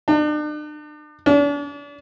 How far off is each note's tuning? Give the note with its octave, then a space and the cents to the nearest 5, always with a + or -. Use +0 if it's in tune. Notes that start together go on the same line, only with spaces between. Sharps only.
D4 +40
D4 -40